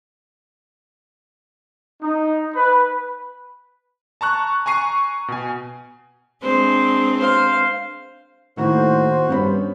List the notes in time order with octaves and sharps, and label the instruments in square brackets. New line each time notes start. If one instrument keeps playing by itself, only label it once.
[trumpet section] D#4
B4
[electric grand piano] A5 A#5 C#6 F#6
G#5 A#5 C#6 C7 D#7
B2 G#5
[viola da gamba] G#3 C4 D4 [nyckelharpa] C5
[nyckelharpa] C5 F5
[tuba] A2 [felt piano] D#3 A#3 E4 [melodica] F#4 [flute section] C5
[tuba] G2 [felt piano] B3 C#4 B5